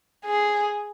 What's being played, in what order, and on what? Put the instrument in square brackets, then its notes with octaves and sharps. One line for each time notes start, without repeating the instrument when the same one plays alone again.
[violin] G#4